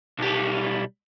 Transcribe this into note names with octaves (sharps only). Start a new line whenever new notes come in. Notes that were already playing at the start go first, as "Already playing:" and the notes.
B1 G3